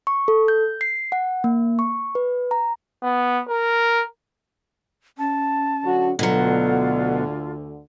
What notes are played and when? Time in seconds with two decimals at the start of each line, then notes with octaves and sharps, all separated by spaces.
0.07 C#6
0.28 A4
0.48 G6
0.81 C7
1.12 F#5
1.44 A#3
1.79 C#6
2.15 B4
2.51 A#5
3.03 B3
3.48 A#4
5.18 C#4 A5
5.84 D3 F#3 F#4
6.19 D2 B2 D3 F#3 F4 A4